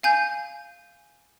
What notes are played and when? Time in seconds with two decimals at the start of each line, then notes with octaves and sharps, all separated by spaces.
0.03 F5 G#5 G6